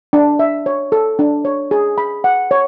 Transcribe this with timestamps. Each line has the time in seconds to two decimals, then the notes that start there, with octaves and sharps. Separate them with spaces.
0.13 D4
0.39 E5
0.66 C#5
0.92 A4
1.19 D4
1.45 C#5
1.71 G#4
1.98 B5
2.24 F#5
2.51 C#5